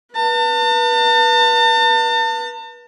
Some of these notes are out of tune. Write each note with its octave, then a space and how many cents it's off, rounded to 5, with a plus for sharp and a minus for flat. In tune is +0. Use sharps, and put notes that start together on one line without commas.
B4 -30 A5 +40